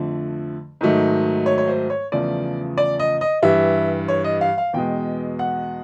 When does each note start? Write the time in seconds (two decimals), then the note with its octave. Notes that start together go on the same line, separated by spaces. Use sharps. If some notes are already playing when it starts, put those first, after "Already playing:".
Already playing: F2 D3 F3 A3
0.81 G#2 D#3 F#3 A3
1.46 C#5
1.58 C#5
1.68 C5
1.90 C#5
2.12 E2 C#3 F3 A3 D5
2.77 D5
2.99 D#5
3.21 D#5
3.42 G2 E3 G3 E5
4.08 C#5
4.24 D#5
4.41 F5
4.58 F5
4.73 E2 B2 G#3 G5
5.39 F#5